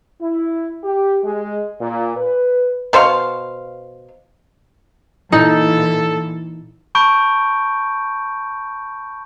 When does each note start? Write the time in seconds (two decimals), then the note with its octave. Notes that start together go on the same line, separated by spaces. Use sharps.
0.22 E4
0.84 G4
1.24 G#3
1.81 A#2
2.17 B4
2.93 B2 C5 C#5 F5
5.32 A#2 E3 D#4 E4 A4
6.95 A5 B5 C#6 G6 D7